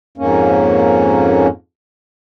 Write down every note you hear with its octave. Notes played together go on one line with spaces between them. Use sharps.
F2 G#2 A#3 C#4